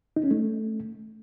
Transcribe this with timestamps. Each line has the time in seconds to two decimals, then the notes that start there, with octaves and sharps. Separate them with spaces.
0.16 D#4
0.24 C#4
0.31 A3